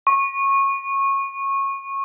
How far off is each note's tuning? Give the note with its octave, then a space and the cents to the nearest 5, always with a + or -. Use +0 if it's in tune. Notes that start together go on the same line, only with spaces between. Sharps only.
C#6 -20